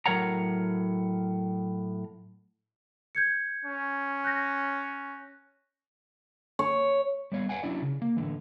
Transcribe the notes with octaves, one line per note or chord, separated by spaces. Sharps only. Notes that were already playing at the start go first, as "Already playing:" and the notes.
A2 F#3 A#4 C#5 F#5 A#5
G6 G#6 C#7
C#4
F#6 G6 A#6
C#5
G3 B3 C#5 F5
B4 F5 F#5 G#5
F#3 C#4 D4 E4 D5
C#3
A#3
A2 D3 E3